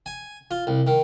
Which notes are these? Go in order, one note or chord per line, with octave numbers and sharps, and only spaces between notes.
G#5
F4
C2
D#3